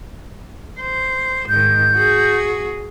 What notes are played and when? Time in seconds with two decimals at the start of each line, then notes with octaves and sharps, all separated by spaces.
0.80 C5
1.49 G#2 D#3 G6
1.95 F#4 G#4